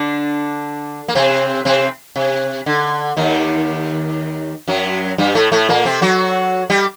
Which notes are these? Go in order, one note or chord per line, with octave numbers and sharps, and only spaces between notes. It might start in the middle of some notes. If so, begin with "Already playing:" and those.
Already playing: D3 D4
A#3
C3 C4
C3 C4
C3
D3
D#2 D#3
F#2 F#3
G2 G3
A2 A3
A2 A3
A#2 A#3
C3 C4
F#3 F#4
G3 G4